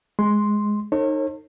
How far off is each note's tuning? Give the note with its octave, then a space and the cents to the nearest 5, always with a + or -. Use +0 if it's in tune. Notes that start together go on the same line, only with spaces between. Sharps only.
G#3 +0 C6 +0
D#4 -15 A4 +40 C#5 -40